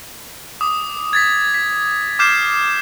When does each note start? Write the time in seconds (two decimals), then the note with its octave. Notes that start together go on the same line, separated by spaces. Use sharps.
0.61 D6 D#6
1.13 G#6 A6 B6
1.54 B6
2.19 D6 F6 G6 C7 E7